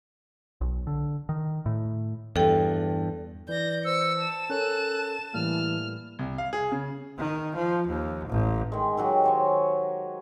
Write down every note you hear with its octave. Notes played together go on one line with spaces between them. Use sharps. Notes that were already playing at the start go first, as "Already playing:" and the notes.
B1
D3
D#3
A2
E2 G2 A4 G5
E3 D5 G6 A#6
C5 E6 C#7
A5 E7
C#4 A4 A#4 C#5 F#6
A2 E3 G3 A#3 F6
C2
F5
G#4
C#3
D#3
F3
D#2
A1
D#3 G#3
D#3 F#3 F#4 G4
C5 C#5 G#5